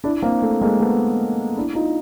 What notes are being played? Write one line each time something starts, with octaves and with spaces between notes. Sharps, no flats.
D4 E4
A#3 C4
A3
G#3 A#3
A3 B3
D4 E4
D#4 F4